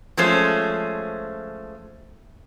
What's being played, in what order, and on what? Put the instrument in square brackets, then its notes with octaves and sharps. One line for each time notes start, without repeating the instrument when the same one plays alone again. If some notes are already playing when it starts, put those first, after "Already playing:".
[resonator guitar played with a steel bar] F3 G#3 A3 C#4 C5